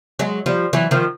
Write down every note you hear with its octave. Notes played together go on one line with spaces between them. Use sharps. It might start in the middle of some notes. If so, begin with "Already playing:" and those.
F#3 G#3
F3 G3
E3 F#3
D#3 F3